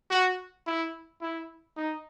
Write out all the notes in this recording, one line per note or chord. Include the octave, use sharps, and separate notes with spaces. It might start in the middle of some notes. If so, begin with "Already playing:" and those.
F#4
E4
E4
D#4